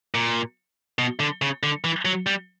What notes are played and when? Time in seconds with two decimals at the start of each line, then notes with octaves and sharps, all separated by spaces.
0.15 A#2
0.99 B2
1.20 D3
1.42 C#3
1.63 D3
1.84 E3
2.05 F#3
2.26 G3